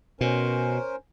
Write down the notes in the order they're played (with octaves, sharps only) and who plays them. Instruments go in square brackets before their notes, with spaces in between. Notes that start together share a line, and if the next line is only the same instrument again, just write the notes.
[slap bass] B2 [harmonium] C#4 A#4 C5